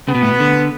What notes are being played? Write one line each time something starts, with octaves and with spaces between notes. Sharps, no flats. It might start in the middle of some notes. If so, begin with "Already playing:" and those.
C#3 B3
B2
A2
B2
D3